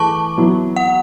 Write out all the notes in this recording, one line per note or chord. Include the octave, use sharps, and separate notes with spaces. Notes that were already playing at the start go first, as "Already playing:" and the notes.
Already playing: E3 A3 G#4 A5 C#6 D6
F#3 B3 E4
F#5